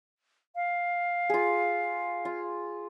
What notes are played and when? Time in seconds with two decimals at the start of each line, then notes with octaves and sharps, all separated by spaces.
0.55 F5
1.30 F4 G#4
2.25 F4